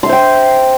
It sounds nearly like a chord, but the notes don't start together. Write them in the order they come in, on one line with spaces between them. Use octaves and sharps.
C6 E5 C5 G5